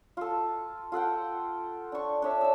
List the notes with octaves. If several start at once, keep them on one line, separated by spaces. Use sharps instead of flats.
F4 A4
F4 A4 F#5 G5
D4 C#6
D4 C#5 E5
A5 E6